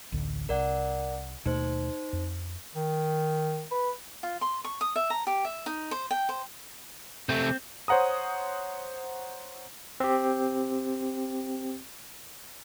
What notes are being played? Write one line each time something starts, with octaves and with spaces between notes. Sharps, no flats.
A1 D2 D3
C2 A#4 D5 F#5
D#2 B2 A3 D#4 C5
F2
D#3
B4
F4
C6
C#6
D#6
E5
A#5
G4
E5
D#4
C5
G5
C5
C3 A3 C4
C5 C#5 F#5 A#5 D#6
C4 G4